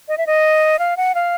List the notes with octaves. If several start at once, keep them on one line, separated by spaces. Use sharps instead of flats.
D#5
E5
D#5
F5
F#5
F5